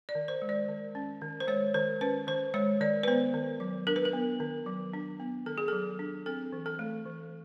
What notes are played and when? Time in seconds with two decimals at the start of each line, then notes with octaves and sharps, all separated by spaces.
0.09 D5
0.15 D#3
0.28 C5
0.42 G#3
0.49 D5
0.68 D#3
0.95 C#4
1.21 D#3
1.40 C5
1.47 G#3 C#5
1.74 D#3 C5
2.01 C#4 B4
2.27 D#3 C5
2.54 G#3 C#5
2.81 D#3 D5
3.03 B4
3.07 B3 C5
3.34 D#3
3.60 F#3
3.87 D4 A#4
3.96 B4
4.05 A#4
4.13 B3
4.40 D#3
4.66 F#3
4.94 D4
5.20 B3
5.46 D#3 A4
5.58 G#4
5.68 F#3 A4
5.99 D4
6.26 C4 A4
6.52 E3
6.66 A4
6.79 A3
7.05 E3